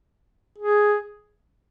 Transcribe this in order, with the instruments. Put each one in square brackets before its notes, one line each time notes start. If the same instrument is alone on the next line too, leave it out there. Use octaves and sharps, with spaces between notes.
[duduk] G#4